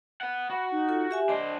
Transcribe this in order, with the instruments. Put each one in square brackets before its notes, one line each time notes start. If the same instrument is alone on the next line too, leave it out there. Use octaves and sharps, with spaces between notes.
[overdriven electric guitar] B4 F#5
[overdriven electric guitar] F#4 [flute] B5
[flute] D#4
[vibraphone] F4 A4
G4 E5 G#5
[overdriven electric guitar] D4 C5 [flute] D#5 [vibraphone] A5